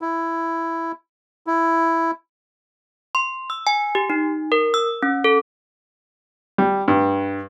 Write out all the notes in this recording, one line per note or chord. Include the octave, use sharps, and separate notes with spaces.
E4
E4
C6
E6
G#5
G4
D#4
A#4
E6
C#4
A4
G3
G2